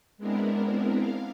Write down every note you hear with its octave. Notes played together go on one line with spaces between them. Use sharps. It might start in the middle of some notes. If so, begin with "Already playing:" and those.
G#3 B3 C4 D4 E4 A#4
F5